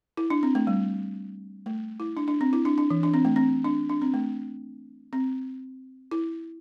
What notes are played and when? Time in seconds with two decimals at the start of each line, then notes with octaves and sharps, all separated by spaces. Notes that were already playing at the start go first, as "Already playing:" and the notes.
0.17 E4
0.30 D4
0.43 C4
0.55 A3
0.67 G3
1.66 A3
2.00 E4
2.17 D4
2.28 D4
2.41 C4
2.53 E4
2.65 D4
2.78 D4
2.90 E3
3.03 D4
3.14 C4
3.25 A3
3.36 C4
3.64 D4
3.89 D4
4.02 C4
4.14 A3
5.13 C4
6.11 E4